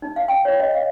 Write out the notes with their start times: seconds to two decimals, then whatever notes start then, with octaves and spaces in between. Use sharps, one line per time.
0.02 D#4
0.16 F5
0.28 G5
0.45 C#5
0.60 D#5
0.74 F5